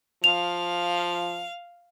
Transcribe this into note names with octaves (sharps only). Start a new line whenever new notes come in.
F3 F5 F7